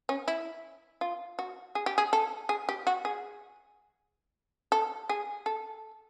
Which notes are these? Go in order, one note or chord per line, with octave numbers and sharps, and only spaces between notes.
C#4
E4
F4
F#4
G#4
G4
G#4
A4
G#4
G4
F#4
G#4
A4
G#4
A4